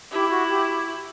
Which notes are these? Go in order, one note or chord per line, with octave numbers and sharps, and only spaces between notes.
E4 G4
F#4
G4